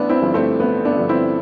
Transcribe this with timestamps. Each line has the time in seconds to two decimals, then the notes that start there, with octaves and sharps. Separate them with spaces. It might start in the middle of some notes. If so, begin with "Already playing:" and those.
Already playing: A1 B3 D4
0.09 C4 E4
0.22 G2 D3 F3
0.34 A3 C4
0.60 A1 B3
0.85 B3 D4
0.97 G2 D3 F3
1.09 C4 E4